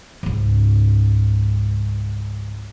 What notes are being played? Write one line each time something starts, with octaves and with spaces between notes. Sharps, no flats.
C#2 G#2